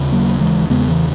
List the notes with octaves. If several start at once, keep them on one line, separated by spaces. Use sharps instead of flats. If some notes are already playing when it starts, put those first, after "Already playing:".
Already playing: D#2 C#3
F#3 A#3
E3 G#3
E2 C#3 G#3 B3
E3